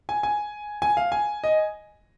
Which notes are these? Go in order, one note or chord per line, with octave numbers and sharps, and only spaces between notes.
G#5
G#5
G#5
F5
G#5
D#5